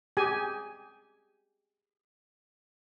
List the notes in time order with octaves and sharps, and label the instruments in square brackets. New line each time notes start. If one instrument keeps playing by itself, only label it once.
[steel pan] G4 G#4 G#5